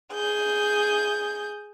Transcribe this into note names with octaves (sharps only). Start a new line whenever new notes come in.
G#4 G6